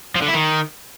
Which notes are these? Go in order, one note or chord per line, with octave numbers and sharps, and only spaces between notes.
F3
D3
E4
D#3